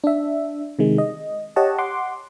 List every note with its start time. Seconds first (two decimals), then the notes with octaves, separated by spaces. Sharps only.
0.04 D4 E5
0.79 C3 D#3 G#3
0.98 D#5
1.56 G4 C#5 D#5 F#5 A5
1.78 F#5 C6 D6